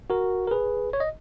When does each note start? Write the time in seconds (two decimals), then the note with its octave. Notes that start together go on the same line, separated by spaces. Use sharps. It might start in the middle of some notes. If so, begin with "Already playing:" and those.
0.10 F#4 A#4
0.48 A#4
0.51 G#4 B4
0.93 C#5
1.00 D#5